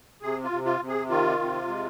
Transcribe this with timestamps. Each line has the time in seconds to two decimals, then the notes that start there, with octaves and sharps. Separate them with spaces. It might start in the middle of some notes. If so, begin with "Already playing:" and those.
0.22 C3 G#4
0.44 F4
0.51 C3
0.65 F4
0.80 C3
0.88 G#4
1.09 D#3 F4
1.39 C3
1.68 G#3